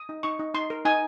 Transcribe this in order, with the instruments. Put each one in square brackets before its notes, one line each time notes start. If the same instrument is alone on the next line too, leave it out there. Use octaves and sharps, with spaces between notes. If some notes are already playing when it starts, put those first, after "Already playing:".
Already playing: [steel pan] D#6
D#4
D#4 C#6
D#4
D#4 C6
A#4
D#4 G#5